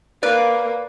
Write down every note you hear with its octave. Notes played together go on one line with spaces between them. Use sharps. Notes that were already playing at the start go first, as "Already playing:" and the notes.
A#3 B4 D5